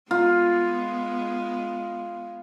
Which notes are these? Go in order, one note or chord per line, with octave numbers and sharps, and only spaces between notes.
G#3 B3 F4